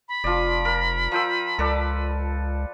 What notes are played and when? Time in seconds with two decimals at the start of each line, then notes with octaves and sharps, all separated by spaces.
0.08 B5
0.24 F1 F3 D5
0.65 A#4
1.12 F3 G5 E6
1.59 C#2 A4 B4 D5